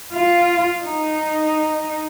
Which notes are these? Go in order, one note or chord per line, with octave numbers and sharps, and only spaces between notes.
F4
D#4